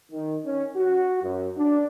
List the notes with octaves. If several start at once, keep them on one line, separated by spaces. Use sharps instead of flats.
D#3
C#4
F#4
F#2
D4